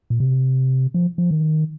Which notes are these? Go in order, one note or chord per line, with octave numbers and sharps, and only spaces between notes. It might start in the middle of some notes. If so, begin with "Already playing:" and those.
A#2
C3
F3
F3
D#3